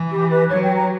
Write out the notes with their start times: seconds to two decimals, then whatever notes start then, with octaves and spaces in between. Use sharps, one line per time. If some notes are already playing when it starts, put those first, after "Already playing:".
Already playing: E3
0.12 G4
0.31 B4
0.50 F#3 C#5
0.63 G5
0.76 A#5